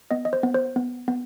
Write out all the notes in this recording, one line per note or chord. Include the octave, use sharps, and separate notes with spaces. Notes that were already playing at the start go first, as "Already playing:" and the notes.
B3 D#5
D#5
C5
B3
C5
B3
B3